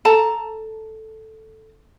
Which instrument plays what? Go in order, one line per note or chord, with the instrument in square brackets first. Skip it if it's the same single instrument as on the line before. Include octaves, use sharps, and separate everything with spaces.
[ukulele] A4 A5 A#5